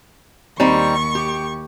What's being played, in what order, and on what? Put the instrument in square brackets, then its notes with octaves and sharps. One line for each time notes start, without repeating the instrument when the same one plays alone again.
[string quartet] D#2 C#6 [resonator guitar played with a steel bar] G3 C4 D#4
[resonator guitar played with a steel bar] G4